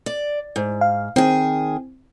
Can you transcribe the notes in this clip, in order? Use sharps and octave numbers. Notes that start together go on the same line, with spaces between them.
D5
G#2
F5
D#3 C4 G#4